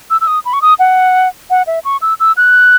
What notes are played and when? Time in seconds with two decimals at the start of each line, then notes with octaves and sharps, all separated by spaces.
0.10 E6
0.21 E6
0.27 D#6
0.45 B5
0.53 C#6
0.62 D#6
0.79 F#5
1.50 F#5
1.67 E5
1.85 C#6
2.02 E6
2.20 E6
2.37 F#6